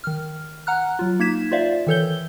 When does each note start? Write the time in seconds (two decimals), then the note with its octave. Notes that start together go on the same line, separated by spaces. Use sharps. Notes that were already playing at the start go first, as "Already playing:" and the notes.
0.04 D#3 F6
0.67 F#5 A#5 F6 F#6
0.99 F#3 F4
1.20 A#3 D#4 G#6 B6 E7
1.51 F4 C5 D5 E5 F5
1.87 D#3 E3 A4 C#5 G6 G7